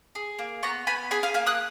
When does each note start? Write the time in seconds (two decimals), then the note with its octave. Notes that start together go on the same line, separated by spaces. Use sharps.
0.15 G#4
0.39 A#3
0.63 B3 A#5 C#6
0.87 B3 G#5 B5
1.11 G#4 G#5 B5
1.23 F5 G#5
1.34 A#3 F5 G#5
1.46 D#6 F#6